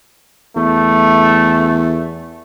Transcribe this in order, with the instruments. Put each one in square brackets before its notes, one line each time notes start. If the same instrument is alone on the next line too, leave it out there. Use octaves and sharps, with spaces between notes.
[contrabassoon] E2 [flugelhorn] A3